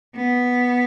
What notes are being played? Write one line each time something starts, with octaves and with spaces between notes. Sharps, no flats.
B3